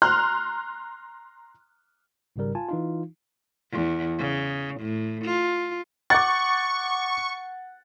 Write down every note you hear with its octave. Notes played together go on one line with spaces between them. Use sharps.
A#5 C6 F6 F#6
G#1 G#2 C#3 G3 A#4
F4 G#5 A5
E3 D#4 F4
E2
C#3
A2
F4
F#5 C#6 D6 A6